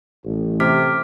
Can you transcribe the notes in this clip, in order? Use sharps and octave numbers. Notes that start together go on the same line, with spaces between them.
A1
C3 D6 F6 B6